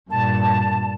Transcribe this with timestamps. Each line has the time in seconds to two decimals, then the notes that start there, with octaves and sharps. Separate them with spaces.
0.11 G2 A#2 A5